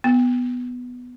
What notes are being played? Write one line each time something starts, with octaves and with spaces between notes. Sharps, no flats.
B3